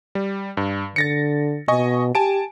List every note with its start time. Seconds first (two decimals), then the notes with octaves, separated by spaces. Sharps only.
0.15 G3
0.57 G2
0.96 D3 A6 A#6 C#7
1.68 B2 D#5 G#5 C#6
2.15 G4 G#5 A5 D7